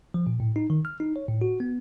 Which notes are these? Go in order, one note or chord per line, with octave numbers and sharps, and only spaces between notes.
F3
A#2
A2
D#4
D#3
F6
D#4
C#5
A2
F#4
B3